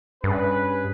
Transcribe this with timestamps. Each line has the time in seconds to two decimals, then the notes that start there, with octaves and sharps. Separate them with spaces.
0.24 G2 C#4 G#4 B4